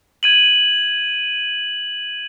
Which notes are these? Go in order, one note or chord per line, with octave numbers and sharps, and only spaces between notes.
G#6 D#7 F#7